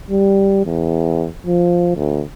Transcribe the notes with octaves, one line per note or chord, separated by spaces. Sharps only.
G3
E2
F3
D2